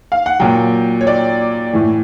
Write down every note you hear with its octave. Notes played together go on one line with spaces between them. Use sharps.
F5
F#5
A#2 F#3 G5
C#5
D5
A2 E3